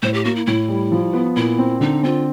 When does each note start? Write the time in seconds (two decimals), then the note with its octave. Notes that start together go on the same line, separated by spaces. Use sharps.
0.02 A2 C5
0.14 G4
0.25 A#3 F#4
0.35 E4
0.46 A2 E4
0.69 G3
0.92 F3
1.13 B3
1.36 A#2 E4
1.59 C4
1.80 D3 D#4
2.03 C4 F4